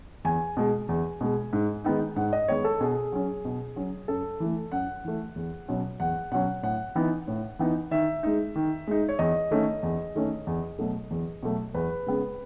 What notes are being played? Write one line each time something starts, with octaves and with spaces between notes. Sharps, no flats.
E2 G#5
B2 G#3
E2
B2 G#3
G#2
D#3 G#3 B3 D#4
G#2 F#5
D#5
D#3 G#3 B3 D#4 C#5
A4
B2 G#4
F#3 C#4
B2
F#3 C#4
F#2 A4
E3 A3
F#2 F#5
E3 A3
E2
B2 F#3 C#4
E2 F#5
B2 F#3 C#4 F#5
A2 F#5
E3 B3 D#4
A2
E3 B3 D#4
D#3 E5
G#3 D#4
D#3
G#3 D#4
C#5
E2 D#5
D#3 A3 C#4
E2
D#3 A3 C#4
E2
B2 F#3 A3
E2
B2 F#3 A3
E2 B4
C#3 G#3 B3